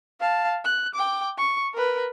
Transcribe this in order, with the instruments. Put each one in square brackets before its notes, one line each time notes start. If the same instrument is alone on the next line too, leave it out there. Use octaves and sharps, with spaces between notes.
[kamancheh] F5 A5
F#6
G5 D6
C#6
A#4 B4